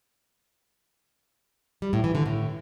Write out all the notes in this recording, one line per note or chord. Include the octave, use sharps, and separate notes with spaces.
G3
A2
E3
D3
A2